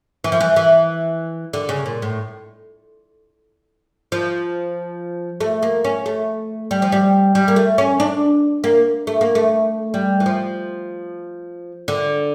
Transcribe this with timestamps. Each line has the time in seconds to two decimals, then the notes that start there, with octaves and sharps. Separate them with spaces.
0.24 E3
0.32 F3
0.41 E3
0.56 E3
1.53 D3
1.69 C#3
1.86 A#2
2.02 A2
4.12 F3
5.40 A3
5.63 A#3
5.84 C#4
6.06 A3
6.71 G3
6.82 F3
6.92 G3
7.35 G3
7.48 A#3
7.56 A3
7.78 C#4
8.00 D4
8.64 A#3
9.07 A3
9.21 A#3
9.35 A3
9.94 G3
10.20 E3
10.26 F3
11.88 D3